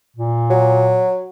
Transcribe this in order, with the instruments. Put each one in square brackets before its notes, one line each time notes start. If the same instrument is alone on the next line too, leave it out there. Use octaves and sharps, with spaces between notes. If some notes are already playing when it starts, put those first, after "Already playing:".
[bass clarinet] A#2
[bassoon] F#3